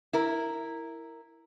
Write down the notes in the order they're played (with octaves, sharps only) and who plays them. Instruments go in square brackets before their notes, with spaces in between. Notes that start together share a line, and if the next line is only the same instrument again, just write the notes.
[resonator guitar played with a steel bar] E4 A#4